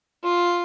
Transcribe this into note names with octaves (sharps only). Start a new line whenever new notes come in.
F4